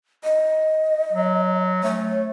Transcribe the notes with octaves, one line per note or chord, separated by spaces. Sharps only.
D#5
F#3
A3 C#5